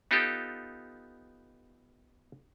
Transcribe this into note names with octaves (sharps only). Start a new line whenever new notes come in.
B3 D#4 F4 G4 A4